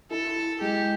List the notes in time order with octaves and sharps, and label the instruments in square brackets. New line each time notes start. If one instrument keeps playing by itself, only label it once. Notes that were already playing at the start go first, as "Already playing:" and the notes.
[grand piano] E4 [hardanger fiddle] A4
[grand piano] E4
[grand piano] G#3 [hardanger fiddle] G4